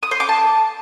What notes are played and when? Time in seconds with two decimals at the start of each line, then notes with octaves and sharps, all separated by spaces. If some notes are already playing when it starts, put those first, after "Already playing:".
0.03 D#6
0.11 C5
0.20 D6
0.29 A5